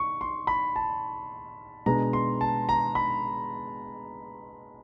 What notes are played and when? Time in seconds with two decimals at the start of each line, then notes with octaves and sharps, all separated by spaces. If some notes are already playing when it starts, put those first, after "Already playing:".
Already playing: C#6
0.21 C6
0.47 B5
0.76 A5
1.86 B2 G#3 B3 D4 A#5
2.13 C6
2.41 A5
2.69 A#5
2.95 B5